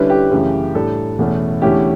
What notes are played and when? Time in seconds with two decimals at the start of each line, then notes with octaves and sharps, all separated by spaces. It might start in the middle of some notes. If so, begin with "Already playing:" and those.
Already playing: D3 G3 C#4 E4 B4
0.10 G4
0.31 F#2 C#3 E3 A3
0.75 A2 G3 D4 A4
1.19 E2 B2 A3 C#4 E4
1.62 E2 D3 A3 C#4 E4 G4